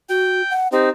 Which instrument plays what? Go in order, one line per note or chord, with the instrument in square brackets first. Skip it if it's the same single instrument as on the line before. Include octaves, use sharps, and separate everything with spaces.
[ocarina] F#4 [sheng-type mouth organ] G5
[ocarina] F#5
[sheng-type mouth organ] C4 D#4 [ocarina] G4